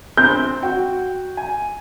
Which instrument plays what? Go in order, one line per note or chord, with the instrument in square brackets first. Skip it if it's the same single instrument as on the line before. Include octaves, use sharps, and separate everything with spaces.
[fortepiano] C4 [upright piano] G6
[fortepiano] F#4 G5
G#5